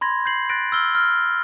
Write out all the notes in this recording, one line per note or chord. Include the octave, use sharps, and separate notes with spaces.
B5 C6 G#6 A#6
G6 G#6 C7 F#7
F#6 A6 A#6 D7
E6 F6 G7
F6